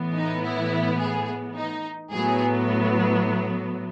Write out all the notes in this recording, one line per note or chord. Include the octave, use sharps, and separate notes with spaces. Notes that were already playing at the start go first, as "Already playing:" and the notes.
Already playing: A2 E3 B3
D#4
E4
G#4
D#4
A2 F#3 B3 G#4